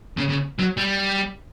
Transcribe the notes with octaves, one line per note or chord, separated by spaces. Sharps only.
C#3
C#3
F#3
G3